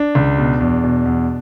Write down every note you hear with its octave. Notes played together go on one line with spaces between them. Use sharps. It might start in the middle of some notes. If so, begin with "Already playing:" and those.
Already playing: D4
C#2
B2
E2
B2
E2